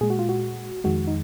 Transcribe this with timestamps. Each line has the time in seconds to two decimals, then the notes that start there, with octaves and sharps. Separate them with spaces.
0.01 A#2 G#3 G#4
0.10 F#4
0.19 F4
0.29 F#4
0.84 F2 D#3 G#3 F#4
1.07 D#4